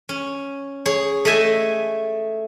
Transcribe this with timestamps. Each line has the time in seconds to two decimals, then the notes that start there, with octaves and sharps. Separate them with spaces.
0.09 C#4
0.86 G#4 C#5
1.25 A3 D#5 E5 G#5